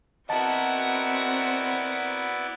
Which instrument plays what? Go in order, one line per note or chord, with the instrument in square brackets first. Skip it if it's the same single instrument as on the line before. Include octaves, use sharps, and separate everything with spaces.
[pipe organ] B3 E4 D5 [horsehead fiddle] C4 [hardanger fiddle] F#4 A#4 [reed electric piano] D#5 A5